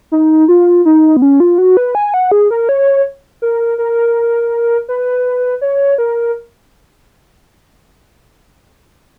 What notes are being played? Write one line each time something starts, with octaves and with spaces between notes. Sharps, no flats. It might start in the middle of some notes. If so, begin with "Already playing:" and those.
D#4
F4
D#4
B3
C#4
F4
F#4
B4
G#5
F#5
G#4
A#4
C#5
A#4
A#4
B4
C#5
A#4